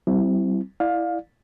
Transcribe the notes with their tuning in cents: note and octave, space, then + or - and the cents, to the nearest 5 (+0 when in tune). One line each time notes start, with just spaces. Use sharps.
G3 -35 C4 -10 E4 +0
E4 +0 D5 +10 F5 +20